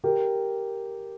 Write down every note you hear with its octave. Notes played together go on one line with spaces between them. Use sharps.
G4 A#4